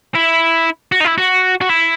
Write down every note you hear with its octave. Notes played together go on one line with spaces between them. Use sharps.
E4
F#4
D#4
E4
F#4
F#4
E4